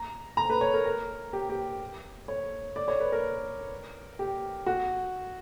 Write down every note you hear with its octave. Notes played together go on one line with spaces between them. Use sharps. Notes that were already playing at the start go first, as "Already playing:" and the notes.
Already playing: A#5
A#5
B4
C#5
A#4
A#4
G4
G4
C#5
D5
C#5
B4
A#4
G4
F#4